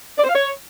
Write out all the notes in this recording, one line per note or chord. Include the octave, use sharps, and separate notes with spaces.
D5
C5
F5
C#5